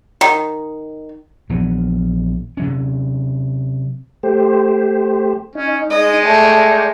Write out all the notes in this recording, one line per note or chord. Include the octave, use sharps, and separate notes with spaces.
D#3
A#1 E3 B3
C3 F#3 C#4
A3 G4 C5
C#4 D#4
G#3 D#5
A3 D5 G5 C#6